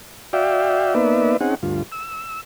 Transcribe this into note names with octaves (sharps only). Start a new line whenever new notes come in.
F#4 D5 E5 F5 G5
A#3 B3 D#4 B4 D5 E5
C4 C#4 D#4 G#4 F#5
D2 G2 F4
E6